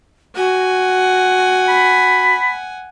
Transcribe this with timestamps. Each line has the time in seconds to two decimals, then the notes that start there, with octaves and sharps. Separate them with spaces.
0.36 F#4 F#5 G#5
1.69 B5